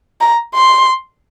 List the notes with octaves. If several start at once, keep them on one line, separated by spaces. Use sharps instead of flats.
A#5
C6